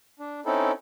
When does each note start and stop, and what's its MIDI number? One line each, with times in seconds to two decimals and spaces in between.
0.20 0.40 62
0.46 0.72 60
0.46 0.72 61
0.46 0.72 63
0.46 0.72 64
0.46 0.72 69